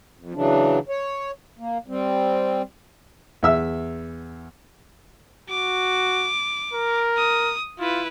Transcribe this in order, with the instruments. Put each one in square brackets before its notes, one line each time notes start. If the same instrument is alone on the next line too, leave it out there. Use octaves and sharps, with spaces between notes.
[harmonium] F2
C#3 E3 F#3 D4
C#5
A#3
G3 C4
[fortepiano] E2 E5 E6
[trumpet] F#4 [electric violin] D6
[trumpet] A#4
[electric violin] D#6
[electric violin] E4 B4 [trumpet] F4